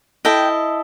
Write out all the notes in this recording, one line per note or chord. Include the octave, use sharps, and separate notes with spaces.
E4 A4 D#5 G5